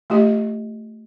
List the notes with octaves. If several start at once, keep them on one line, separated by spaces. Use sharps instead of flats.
A3 F4 G4 D#5